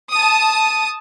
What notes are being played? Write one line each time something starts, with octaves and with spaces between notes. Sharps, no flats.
A5 D#6